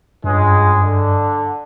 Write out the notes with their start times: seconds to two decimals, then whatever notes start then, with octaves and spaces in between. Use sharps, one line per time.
0.24 C#2 G2 G#3
0.83 D3